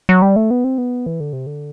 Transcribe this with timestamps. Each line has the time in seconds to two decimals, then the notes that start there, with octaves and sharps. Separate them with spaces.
0.09 F#3
0.22 G3
0.36 A3
0.51 B3
0.64 C4
0.78 B3
1.06 E3
1.20 D3
1.33 C3
1.47 D3